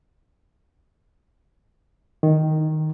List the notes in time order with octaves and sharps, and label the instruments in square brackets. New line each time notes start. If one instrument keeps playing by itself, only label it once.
[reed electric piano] D#3